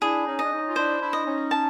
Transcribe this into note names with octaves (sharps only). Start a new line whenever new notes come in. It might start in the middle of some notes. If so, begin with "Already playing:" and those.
D4 E4 G#4
C#4 D#4
D4 D#5
C#4 D#4
F4
D4 E4 C5
D4 E4
D#5
C#4 D#4
A5